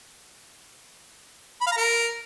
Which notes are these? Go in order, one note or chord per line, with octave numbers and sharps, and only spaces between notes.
B5
F5
A#5
A#4